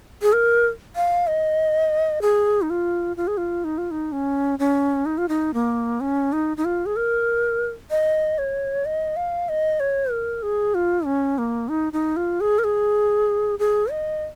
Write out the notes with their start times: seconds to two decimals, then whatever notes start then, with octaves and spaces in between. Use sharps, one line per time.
0.22 G#4
0.33 A#4
0.96 F5
1.27 D#5
2.22 G#4
2.62 D#4
2.70 F4
3.17 F4
3.27 G#4
3.37 F4
3.64 D#4
3.78 F4
3.91 D#4
4.12 C#4
4.59 C#4
5.06 D#4
5.18 F4
5.29 D#4
5.54 A#3
6.01 C#4
6.33 D#4
6.57 D#4
6.65 F4
6.86 G#4
6.96 A#4
7.90 D#5
8.38 C#5
8.86 D#5
9.16 F5
9.49 D#5
9.80 C#5
10.11 A#4
10.43 G#4
10.75 F4
11.06 C#4
11.38 A#3
11.69 D#4
11.93 D#4
12.16 F4
12.41 G#4
12.59 A#4
12.64 G#4
13.59 G#4
13.91 D#5